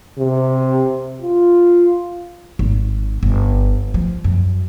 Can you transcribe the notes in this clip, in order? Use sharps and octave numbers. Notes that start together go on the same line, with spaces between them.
C3
F4
G#1
G1
F3
F#2